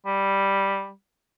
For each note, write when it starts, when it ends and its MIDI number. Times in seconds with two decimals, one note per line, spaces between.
0.06 0.91 55